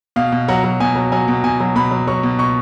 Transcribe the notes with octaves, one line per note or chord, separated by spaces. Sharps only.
B2 F5
B2
F#3 F#5
F#3
B2 G#5
F#3
F#3 G#5
B2
B2 G#5
F#3
B2 B5
F#3
F#3 C#6
B2
B2 C#6